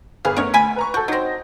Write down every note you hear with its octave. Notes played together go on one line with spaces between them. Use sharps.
G1 G#4 B4 F5
A3 B3 C#4 A#4 C#5
D2 G#5 B5
B4 A#5 C#6
F#4 A4 G6
F#3 C4 D#4 A#6